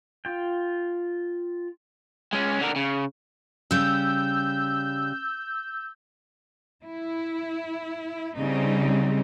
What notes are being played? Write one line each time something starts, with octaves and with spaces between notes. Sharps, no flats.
F4 G5
G#3 C#4
D3 A#4
C#3
C#3 G3 E6 G6
E4
C#3 G3 C4 D#4